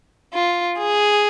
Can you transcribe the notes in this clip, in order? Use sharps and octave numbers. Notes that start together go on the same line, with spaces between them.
F4
G#4